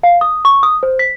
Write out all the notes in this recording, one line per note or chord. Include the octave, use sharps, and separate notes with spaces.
F5
D#6
C#6
D#6
C5
B6